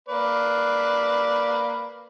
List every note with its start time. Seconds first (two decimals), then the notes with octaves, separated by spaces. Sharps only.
0.08 A#3 B4 D5